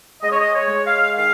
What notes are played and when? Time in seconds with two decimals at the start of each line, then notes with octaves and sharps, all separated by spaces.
0.22 G#3 D#5
0.31 C#5
0.39 D#5
0.54 C#5
0.69 G#3
0.86 F5
1.17 D#3 F5